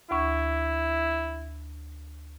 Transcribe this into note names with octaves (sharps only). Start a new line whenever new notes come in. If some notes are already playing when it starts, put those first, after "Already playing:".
D2 E4 C#6